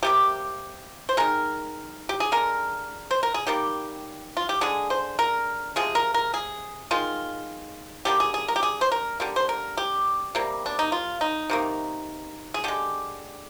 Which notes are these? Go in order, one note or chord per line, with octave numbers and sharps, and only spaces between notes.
C3 G3 A#3 G4
C5
D#3 G#3 A#4
G4
G#4
D3 G#3 A#4
C5
A#4
G#4
D#3 G3 A#3 G4
F4
G4
D3 G#3 G#4
C5
A#4
C3 F3 G#3 G#4
A#4
A#4
G#4
D#3 G#3 F4
D3 G3 A#3 G4
G#4
G#4
A#4
G4
G#4
C5
A#4
D3 G3 A#3
C5
A#4
G4
C3 G3 A#3
D4
D#4
F4
D#4
C3 D#3 A#3
G#4
D3 G#3 G4